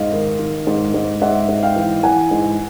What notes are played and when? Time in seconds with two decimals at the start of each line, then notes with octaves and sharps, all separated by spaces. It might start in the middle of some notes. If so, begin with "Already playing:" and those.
Already playing: G#2 D#5 F5
0.12 D#3
0.39 D#3
0.67 G#2
0.94 G#2
1.21 G#2 E5 F#5
1.49 G#2
1.63 F5 G5
1.76 E3
2.03 E3 F#5 G#5
2.31 G#2